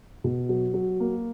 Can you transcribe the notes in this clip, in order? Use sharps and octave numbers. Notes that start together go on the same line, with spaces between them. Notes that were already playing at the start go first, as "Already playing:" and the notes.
B2
F#3
F#3
A#3